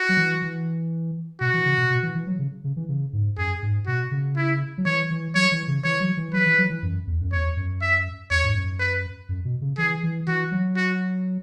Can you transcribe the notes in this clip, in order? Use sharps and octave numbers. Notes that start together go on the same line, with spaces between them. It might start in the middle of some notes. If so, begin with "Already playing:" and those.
Already playing: F#4
F#3
E3
E3
B2 F#4
E3
C#3
B2
B2
E3
E3
F#3
C#3
C#3
E3
C#3
G#2
F#2 G#4
G#2
B2 F#4
C#3
E4
F#3
E3 C#5
E3
F#3 C#5
E3
C#3
E3 C#5
F#3
E3
F#3 B4
E3
F#3
E3
F#2
E2
F#2
E2 C#5
F#2
E5
E2 C#5
G#2
F#2
B4
F#2
B2
C#3
E3 G#4
E3
E3 F#4
F#3
F#4